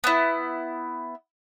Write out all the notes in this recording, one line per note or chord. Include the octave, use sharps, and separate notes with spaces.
B3 E4